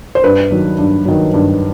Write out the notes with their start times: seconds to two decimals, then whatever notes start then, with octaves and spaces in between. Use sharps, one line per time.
0.15 C5
0.24 G2 B4
0.51 D#3 F#3
0.78 G2
1.05 D#3 F#3
1.34 G2